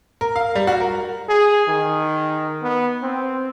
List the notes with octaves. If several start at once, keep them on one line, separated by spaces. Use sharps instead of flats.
A#4
F5
G3
F#4
A#4
G#4
D#3
B3
C4